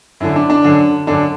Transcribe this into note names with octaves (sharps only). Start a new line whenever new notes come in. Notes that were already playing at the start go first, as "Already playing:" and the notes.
F#2 D3 E4
D4
D4
F#2 D3
F#2 D3 D4